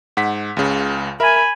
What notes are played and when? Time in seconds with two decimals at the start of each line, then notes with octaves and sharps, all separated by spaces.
0.17 G#2 F#5 B6
0.57 C#2 C#3
1.20 A#4 E5 G#5 B5